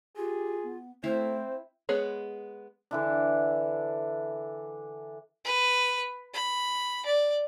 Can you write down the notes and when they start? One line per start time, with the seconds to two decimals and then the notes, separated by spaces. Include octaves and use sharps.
0.17 F4 G4 G#4
0.64 B3
1.04 A3 C4 E4 C5 F5
1.89 G#3 B3 G#4 C#5
2.91 D3 E3 D4
5.45 B4
6.34 B5
7.06 D5